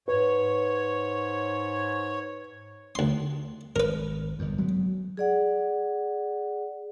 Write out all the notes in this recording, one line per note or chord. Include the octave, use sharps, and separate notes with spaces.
G#2 B4 C#5
D2 C6
G#1 A#4 B4
G1 E2
F#3 G#3 B3
G#4 D5 F#5